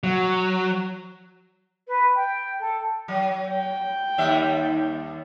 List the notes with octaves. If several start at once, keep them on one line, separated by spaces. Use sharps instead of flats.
F#3
B4
G5
A4
F#3
G5
D#2 G3 E5